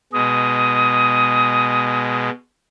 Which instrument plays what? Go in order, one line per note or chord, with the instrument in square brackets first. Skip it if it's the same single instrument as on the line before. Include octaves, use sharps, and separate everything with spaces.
[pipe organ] B2 G#3 [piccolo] D#6